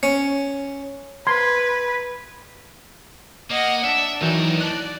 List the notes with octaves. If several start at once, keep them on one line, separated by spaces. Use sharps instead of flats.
C#4
B4 C6 G#6
A#3 D#5 F#5
D4 E5
A2 D#3 E3 F#3 D#4 D5
D5 A5 F#6